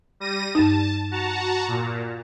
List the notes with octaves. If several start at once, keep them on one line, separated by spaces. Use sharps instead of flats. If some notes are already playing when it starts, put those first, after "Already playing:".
G3 A#6 D#7
G2 D#4 A5
F#4 A5 A#5
A#2